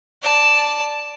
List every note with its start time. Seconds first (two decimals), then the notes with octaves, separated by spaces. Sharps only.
0.22 D5 A5